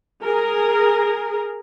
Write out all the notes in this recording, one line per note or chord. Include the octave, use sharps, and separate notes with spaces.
G#4 A#4